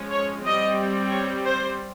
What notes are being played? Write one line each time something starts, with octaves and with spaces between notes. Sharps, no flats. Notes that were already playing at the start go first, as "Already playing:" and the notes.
Already playing: F3 G#3 C#4
C#5
G3 C4 D#5
C#5
C5